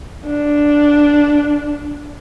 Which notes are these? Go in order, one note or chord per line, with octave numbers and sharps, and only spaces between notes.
D4